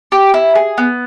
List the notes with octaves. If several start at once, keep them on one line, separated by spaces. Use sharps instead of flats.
G4
E4
G#4
B3